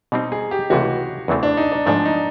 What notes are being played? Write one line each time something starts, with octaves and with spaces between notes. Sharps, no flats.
B2 G3 C4 D#4
G#4
G4
C#2 C3 E3 A3 F#4
E2 C#3 E3 A3 C4
D4
D#4
D4
G#2 F3 A3 D4
D#4